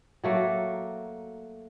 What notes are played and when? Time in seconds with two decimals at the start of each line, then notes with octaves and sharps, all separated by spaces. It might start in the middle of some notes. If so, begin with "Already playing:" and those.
0.24 F#3 A3 A#3